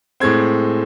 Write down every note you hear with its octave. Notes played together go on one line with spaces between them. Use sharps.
A2 G#3 C4 G#6